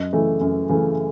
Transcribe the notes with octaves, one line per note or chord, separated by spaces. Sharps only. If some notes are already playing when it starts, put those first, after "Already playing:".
Already playing: F#2 D#5
C#3 E3 A3
F#2
C#3 E3 A3